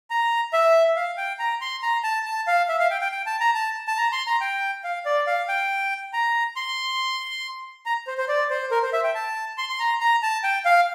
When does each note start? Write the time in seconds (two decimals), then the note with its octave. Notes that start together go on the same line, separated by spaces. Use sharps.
0.10 A#5
0.53 E5
0.96 F5
1.18 G5
1.39 A#5
1.61 C6
1.82 A#5
2.04 A5
2.25 A5
2.47 F5
2.69 E5
2.79 F5
2.91 G5
3.01 G5
3.12 G5
3.26 A5
3.40 A#5
3.55 A5
3.87 A5
3.98 A#5
4.12 C6
4.27 A#5
4.41 G5
4.84 F5
5.05 D5
5.27 F5
5.48 G5
6.13 A#5
6.56 C6
7.86 A#5
8.07 C5
8.18 C5
8.28 D5
8.50 C5
8.71 A#4
8.82 C5
8.93 E5
9.04 G5
9.15 A5
9.58 C6
9.69 C6
9.79 A#5
10.01 A#5
10.23 A5
10.44 G5
10.65 F5